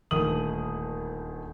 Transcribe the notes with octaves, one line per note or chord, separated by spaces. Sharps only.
D#1 D2 D#3 D#6 F#7